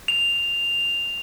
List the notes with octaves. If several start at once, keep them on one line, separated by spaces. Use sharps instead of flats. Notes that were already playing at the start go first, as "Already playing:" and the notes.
F7